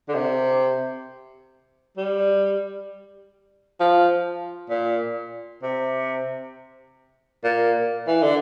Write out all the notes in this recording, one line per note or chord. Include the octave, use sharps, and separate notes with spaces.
D3
C3
G3
F3
A#2
C3
A#2
E3
D3